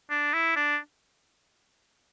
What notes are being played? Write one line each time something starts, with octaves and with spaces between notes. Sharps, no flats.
D4
E4
D4